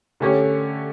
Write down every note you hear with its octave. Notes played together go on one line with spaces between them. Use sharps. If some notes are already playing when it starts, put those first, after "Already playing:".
D3 A3 C#4 G4 C#5